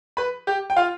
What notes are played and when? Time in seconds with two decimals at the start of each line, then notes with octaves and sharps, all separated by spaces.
0.17 B4 B5
0.47 G4 G5
0.70 G5
0.76 F4 F5